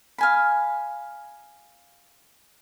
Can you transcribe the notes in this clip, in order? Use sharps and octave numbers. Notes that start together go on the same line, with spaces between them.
F5 G#5 B5